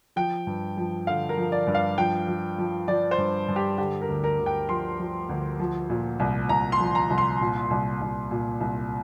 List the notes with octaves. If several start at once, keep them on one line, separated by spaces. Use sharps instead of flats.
F3 G5
G2
F3
D3 F5
A#4
F3
D5
G2
F5
F3 G5
F3
F3
F3 D5
C5
G2
G2
G4
D3 G4
A#4
D2
A#4
D2
G5
F3 C6
F3
D2
F3
A#2
C2
C2 A#5
C6
F3
A#5
C2
C6
A#2
C2
C2
A#2
C2